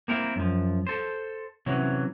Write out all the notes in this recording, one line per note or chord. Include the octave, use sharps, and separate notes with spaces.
A#3 C4 E4 A#4
F#2 F3
A4 C5
C3 E3 F#3 C#4